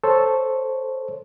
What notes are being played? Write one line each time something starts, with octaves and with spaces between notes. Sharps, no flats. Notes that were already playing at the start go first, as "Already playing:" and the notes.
A4 C5 C#5